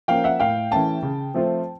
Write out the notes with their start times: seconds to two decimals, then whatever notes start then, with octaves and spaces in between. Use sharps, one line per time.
0.08 F3 A#3 C#4 F5 G5
0.24 E5 F#5
0.40 A2 F5 G5
0.71 E3 A3 C#4 G5 A5
1.02 C#3
1.34 F3 A3 C4 F4